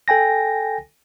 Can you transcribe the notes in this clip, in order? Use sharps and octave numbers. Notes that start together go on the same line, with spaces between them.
A4 G5 G#5 A#6